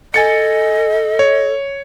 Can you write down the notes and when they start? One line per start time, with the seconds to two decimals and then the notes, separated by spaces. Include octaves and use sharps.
0.14 A4 D#5 G#5 A6 C#7
1.19 C#5